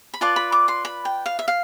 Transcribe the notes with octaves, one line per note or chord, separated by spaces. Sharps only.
B5
F4 B4 D5 A5
B5
D6
C6
B5
G5
F5
E5
F5